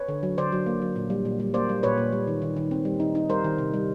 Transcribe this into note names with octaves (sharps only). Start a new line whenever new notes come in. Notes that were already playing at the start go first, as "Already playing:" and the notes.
Already playing: B4 C#5
D3
F#3
D3 C5 D5
F#3
A#3
F#3
A#2
G3
A#2
G3
A#3 C5 D5
G3
A#2 B4 C#5
A#2
G3
D#3
D#3
D#3
C4
G3
D#4
D#4
G3 A#4 C5
D#3
C3
G3